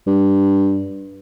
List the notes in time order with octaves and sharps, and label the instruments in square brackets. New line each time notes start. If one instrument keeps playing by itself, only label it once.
[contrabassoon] G2